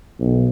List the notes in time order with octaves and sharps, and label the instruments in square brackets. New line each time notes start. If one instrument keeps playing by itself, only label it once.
[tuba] B1